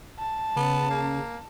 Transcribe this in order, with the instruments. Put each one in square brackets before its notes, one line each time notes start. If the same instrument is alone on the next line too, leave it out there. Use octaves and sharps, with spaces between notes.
[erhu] A5
[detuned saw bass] C#3 [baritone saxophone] B3
[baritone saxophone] A#3